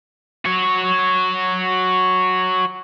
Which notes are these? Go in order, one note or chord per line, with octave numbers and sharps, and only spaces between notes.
F#4 C#5